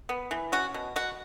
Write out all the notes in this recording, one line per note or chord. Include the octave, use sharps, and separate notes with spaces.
B3
E3
C#4 F#4
B2
B2 F#4